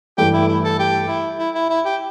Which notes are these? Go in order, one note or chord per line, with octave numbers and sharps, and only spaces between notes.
G2 E3 A3 G4
E4
E4
A4
G4
E4
E4
E4
E4
G4